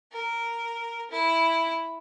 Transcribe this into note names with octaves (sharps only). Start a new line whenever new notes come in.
A#4
E4